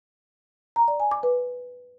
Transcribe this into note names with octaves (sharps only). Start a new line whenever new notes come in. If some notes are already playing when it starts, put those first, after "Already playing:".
A#5
D5
G#5
D6
B4